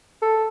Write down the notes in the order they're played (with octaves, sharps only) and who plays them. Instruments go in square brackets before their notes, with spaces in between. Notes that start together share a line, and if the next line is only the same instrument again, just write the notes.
[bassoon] A4